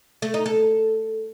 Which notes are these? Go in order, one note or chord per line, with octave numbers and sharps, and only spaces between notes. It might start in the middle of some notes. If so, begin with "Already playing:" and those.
A3
D#4
A4